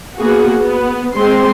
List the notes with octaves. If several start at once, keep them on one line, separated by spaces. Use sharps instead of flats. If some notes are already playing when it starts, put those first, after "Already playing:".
A#3 B3 F#4 G#4
B3
G#3 C4 C6